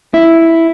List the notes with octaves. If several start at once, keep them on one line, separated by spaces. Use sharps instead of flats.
E4